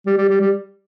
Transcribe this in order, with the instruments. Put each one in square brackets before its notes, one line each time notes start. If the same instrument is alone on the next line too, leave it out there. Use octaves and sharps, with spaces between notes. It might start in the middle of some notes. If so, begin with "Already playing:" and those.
[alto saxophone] G3
G3
G3
G3